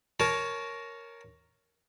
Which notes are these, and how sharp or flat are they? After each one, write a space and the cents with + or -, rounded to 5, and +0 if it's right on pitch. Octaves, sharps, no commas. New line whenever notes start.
A#4 +0 C#5 +0 A5 -30